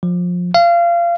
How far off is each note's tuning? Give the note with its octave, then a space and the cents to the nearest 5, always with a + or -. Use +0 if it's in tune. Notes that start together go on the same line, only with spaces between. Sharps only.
F3 +25
F5 -25